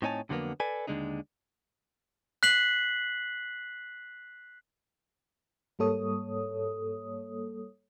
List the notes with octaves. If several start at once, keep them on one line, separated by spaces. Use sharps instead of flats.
A2 C4 D#4 C#5 G#5 A5
F2 D3 F#3 G#3 A#3 B3
A4 B4 D5 G#5
D#2 A2 D3 G#3 D4 D#4
F#6 B6 C7 F#7
G#2 G3 A#3 A4 C#5 D#6